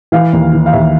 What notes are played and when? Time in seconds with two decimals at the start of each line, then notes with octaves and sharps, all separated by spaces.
0.12 E3 F5
0.33 D#2
0.53 E3
0.66 F5
0.73 D#2 E5